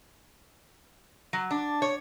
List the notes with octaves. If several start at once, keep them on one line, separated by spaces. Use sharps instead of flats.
F#3
D4
C#5